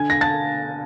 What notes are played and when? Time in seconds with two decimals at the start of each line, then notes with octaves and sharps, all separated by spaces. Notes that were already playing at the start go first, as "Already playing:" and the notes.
Already playing: D3 G#5 G#6
0.10 A#6
0.21 A5 A6